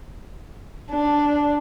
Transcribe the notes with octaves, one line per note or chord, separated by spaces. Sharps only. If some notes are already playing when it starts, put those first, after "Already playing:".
D4